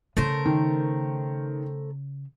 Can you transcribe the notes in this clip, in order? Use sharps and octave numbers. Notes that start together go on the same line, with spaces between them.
C#3 A3 A#4 C5
D#3